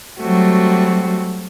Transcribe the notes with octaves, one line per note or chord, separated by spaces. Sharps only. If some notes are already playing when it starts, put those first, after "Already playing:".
F#3 G3 A3 C4 F#4